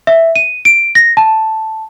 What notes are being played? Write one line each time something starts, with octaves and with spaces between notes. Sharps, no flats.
E5
D#7
D7
A#6
A5